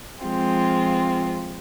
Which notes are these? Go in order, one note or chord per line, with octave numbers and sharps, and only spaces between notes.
F3 G#3 C4 F4